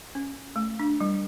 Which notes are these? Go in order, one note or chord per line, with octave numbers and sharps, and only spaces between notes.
C#4
A3
D4
G3